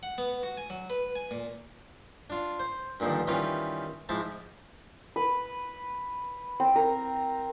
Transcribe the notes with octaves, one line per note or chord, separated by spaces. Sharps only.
F#5
B3
F#4
G#5
F#3
B4
G#5
A#2
D4 F4
C5
G2 A#2 D3 D#3 F3
D#3 E3 G3 C#4 F4 B4
G#2 F3 E4 A5
B4
C4
A#4